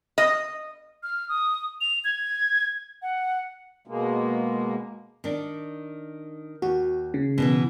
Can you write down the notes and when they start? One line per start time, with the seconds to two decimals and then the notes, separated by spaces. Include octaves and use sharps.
0.18 D#5
1.03 F6
1.29 D#6
1.81 F7
2.04 G#6
3.02 F#5
3.87 B2 G#3 A#3
5.24 D#3 D4
6.62 D#2 F#4
7.14 C#3
7.38 B2 D#3 E3